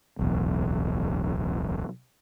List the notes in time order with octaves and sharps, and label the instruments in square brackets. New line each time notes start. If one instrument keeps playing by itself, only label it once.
[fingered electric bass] D1 B1 E2